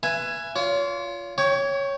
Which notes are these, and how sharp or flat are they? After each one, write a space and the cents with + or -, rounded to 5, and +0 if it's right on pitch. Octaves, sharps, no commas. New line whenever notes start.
B4 +0 E5 +30 G#5 +0
F4 +0 C#5 +40
C#5 +0 G5 +0 C#6 +45